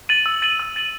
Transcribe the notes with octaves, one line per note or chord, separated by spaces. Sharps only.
A6 D#7 F#7
E6
A6 D#7 F#7
E6
A6 D#7 F#7